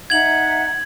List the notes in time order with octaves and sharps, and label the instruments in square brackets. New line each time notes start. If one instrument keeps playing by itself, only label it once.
[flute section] D#4 E5 F#5 [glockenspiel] G#6 F#7